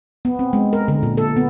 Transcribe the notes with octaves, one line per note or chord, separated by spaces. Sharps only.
B3
C4
G#3
A#4
D3
A#2
A4
B3